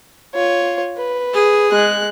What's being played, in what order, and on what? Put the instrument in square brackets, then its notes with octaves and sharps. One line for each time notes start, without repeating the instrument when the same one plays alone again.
[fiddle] F4 C#5
B4
[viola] G#4
[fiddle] G#3 F#6